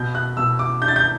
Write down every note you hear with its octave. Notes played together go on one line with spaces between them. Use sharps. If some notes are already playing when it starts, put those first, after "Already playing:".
Already playing: B2 G6
F#6
B2 E6
D6
D4 G6
A6
G6